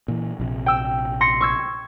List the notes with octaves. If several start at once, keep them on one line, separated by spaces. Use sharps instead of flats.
A#2 E3
A#1 C3
G5 E6
C6 A#6 C#7
C#6 E6 G#6